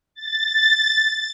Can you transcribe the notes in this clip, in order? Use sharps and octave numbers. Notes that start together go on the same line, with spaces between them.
A6